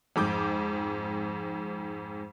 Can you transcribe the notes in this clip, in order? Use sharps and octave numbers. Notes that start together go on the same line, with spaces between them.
F2 G#2 D6 G6